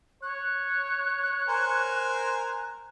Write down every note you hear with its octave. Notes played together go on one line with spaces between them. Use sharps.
C#5 F#6
A#4 C5 G#5